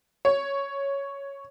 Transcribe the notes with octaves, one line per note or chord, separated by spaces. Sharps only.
C#5